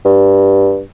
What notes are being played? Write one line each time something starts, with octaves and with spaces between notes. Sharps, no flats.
G2